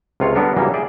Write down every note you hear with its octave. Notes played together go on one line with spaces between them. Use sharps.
C#2 C3 F4 C#5 F5
D3 G3 B3 D4 A4 A#4
C#3 E3 F#3 G3 A#3 C#4
G#4 D5 E5 G5